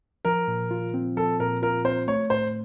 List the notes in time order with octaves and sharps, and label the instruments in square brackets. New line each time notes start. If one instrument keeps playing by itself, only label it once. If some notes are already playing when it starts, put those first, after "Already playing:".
[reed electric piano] F3 [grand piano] A#4
[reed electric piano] A#2
F4
C4
[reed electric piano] F3 [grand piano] A4
[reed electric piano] A#2 [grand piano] A#4
[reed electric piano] F4 [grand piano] A#4
[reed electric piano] C4 [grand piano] C5
[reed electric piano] A3 [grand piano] C#5
[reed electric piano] A2 [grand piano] C5